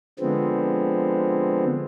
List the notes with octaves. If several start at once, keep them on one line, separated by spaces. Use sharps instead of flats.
D3 F3 G#3 B3 C4